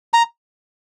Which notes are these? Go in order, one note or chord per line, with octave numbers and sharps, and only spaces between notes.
A#5